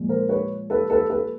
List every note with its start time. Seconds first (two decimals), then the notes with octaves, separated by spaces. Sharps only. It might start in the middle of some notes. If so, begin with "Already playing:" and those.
Already playing: A#2 F3 G#3
0.09 A#4 C5
0.29 B4 C#5
0.70 A4 B4
0.90 A4 B4
1.10 A4 B4